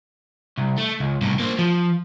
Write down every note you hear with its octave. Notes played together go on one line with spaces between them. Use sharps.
C2
A3
C#2
C2 A2
A#3 C5
F3